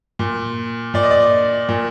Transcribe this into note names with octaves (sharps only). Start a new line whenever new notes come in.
A#2
A#2 D5
D#5
D5
A#2